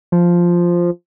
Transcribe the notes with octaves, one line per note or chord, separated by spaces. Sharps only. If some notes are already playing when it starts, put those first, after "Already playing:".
F3